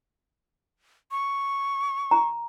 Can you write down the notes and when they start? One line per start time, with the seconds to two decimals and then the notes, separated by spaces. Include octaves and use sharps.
1.11 C#6
2.11 A#5